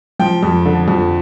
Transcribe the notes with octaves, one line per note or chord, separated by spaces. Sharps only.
F3 G5
F2
D3
F2